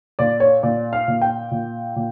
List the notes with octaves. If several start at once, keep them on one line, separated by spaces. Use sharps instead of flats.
A#2 D5
C#5
A#2 D5
F5
A#2
G5
A#2
A#2